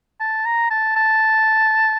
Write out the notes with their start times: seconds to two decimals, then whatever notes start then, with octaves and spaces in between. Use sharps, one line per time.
0.20 A5
0.46 A#5
0.71 A5
0.96 A5